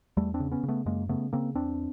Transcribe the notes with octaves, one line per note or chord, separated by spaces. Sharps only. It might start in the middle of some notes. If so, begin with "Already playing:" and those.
E2 G3 A3
C4 D4
C#3
B3 C#4
C#3
A3 B3
F#2 G#3 A#3
C#3 A3 B3
C#3 A#3 C4
E2 C4 D4